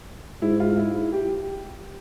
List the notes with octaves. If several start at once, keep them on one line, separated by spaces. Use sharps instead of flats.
G#2 E4
F4
E4
E4
G4